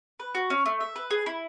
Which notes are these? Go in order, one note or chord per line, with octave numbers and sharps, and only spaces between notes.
B4
F#4
C#4
A3
E5
B4
G#4
E4